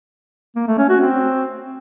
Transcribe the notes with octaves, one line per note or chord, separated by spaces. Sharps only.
A#3
A3
C#4
F#4
C4